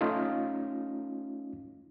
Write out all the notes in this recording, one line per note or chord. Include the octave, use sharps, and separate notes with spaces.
A3 C#4 D#4 F4